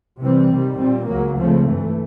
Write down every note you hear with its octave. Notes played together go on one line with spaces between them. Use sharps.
C3 E3 G3 C4
C3 D#3 G3
A#2 G3 C4
C#2 C#3 F#3 A#3
C#2 C#3 F3 A3 C4
G2 E3 A3